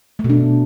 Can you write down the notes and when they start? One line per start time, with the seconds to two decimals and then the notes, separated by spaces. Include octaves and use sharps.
0.19 A3
0.24 B2
0.30 D4